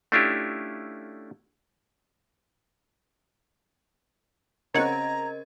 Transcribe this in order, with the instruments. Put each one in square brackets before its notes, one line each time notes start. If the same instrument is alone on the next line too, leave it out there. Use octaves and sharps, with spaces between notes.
[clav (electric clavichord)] A3 C#4 D4 E4 F4 G4
[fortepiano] C#3 C4 [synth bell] A#4 D#5 G#6 [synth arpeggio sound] C#5 F#5 [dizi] A#5